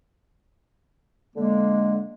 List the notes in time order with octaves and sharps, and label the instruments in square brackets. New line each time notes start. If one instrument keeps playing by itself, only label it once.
[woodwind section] D3 G#3 A#3